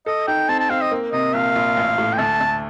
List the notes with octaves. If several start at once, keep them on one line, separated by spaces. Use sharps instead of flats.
A4 D#5
D#4 G5
C4 A5
A5
C4 F5
D#5
A#3
C3 D#5
A#1 F5
A#1
A1
A2
G5
D2 A5
D2